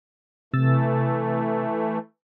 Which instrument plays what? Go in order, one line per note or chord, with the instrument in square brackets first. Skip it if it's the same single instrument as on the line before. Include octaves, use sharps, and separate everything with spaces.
[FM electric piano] C3 E6 A6 [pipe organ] E3 A3